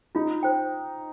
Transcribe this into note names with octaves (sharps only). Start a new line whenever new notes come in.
D#4 F4
C5 G5